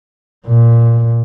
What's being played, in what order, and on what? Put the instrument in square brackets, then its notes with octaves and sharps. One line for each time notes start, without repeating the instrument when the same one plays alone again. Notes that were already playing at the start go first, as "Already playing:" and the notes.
[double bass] A#2